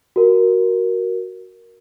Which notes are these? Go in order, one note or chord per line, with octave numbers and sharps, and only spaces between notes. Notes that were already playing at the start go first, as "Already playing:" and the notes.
F#4 A#4